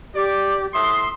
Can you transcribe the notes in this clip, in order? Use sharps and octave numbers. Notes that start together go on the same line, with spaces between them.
G4 D5
A2 E5 C6 D#6